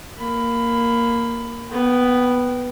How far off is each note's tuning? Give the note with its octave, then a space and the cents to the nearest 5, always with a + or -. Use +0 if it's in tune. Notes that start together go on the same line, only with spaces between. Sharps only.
A#3 +0 B5 +15
B3 +0 G5 -25